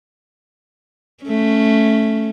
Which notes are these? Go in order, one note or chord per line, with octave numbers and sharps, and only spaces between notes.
A3 C#4